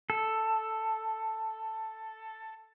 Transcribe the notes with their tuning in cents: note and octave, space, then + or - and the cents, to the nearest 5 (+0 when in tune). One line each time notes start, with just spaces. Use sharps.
A4 +5